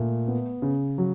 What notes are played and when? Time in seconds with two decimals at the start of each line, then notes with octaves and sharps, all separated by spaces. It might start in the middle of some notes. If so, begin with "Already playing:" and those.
Already playing: A#2 A3
0.28 B3
0.62 C#3
0.98 F#3